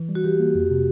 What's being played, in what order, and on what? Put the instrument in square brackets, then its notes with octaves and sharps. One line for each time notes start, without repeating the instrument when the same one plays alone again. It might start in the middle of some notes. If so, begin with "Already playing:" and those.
Already playing: [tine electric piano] E3
G3
[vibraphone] F#4
[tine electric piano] E3 [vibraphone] G4
[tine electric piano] A#3
F2
C3